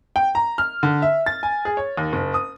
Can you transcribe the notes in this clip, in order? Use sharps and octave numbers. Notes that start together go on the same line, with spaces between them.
G5
A#5
F6
D3
E5
A6
G#5
G#4
C#5
D#2
F#1
D#6